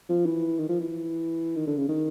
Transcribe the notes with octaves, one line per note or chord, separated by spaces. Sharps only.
F3
E3
D#3
F3
E3
D#3
D3
C#3
D#3